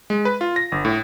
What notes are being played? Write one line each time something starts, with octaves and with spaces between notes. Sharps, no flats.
G#3
B4
F4
A#6
G1
A2